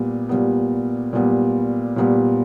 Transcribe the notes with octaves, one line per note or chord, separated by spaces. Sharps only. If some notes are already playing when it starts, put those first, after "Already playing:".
Already playing: A#2 G3 B3
A#2 G3 B3
A#2 G3 B3
A#2 G3 B3